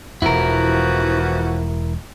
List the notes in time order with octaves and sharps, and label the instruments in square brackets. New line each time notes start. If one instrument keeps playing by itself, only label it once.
[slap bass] E1 E2 [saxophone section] E3 F3 F#4 [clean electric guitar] E4 A#4